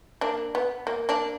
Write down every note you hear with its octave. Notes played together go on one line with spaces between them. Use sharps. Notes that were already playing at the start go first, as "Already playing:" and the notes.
A#3 D4
B3
A#3
A#3 D4